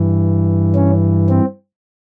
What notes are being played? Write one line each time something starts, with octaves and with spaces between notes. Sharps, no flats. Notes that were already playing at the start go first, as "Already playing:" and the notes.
Already playing: G2 E3
C#4
C4